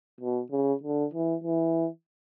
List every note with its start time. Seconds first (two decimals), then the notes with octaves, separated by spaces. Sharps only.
0.21 B2
0.51 C#3
0.83 D3
1.14 E3
1.44 E3